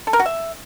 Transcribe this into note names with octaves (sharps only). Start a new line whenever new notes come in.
A4
A#4
F#4
E5